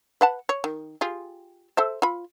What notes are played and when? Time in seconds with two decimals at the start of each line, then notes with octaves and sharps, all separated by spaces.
0.21 B4 F#5 A5
0.49 C#5
0.64 D#3
1.01 F4 G4 G#4
1.77 A4 C5 E5
2.02 F4 B5